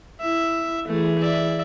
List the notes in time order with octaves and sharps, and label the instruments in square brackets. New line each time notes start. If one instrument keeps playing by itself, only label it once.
[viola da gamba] E4 [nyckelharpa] E5
[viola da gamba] E3 G#4 [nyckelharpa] A3
[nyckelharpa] D5 E5